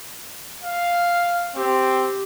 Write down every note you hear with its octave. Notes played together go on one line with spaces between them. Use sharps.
F5
C4 G4